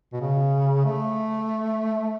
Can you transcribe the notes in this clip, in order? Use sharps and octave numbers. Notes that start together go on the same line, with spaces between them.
B2
C#3
A3